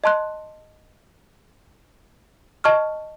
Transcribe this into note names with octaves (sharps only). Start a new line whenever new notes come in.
D#5 A5 C6 F#6
D#5 A5 C#6 F6